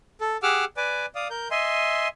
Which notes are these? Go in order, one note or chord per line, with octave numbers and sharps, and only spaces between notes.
A4
G4 G#4 F#5 D6 E6 F6
B4 D5 G#5 D6
D5 F5 D#6
A#4 G6
D#5 E5 G#5 C6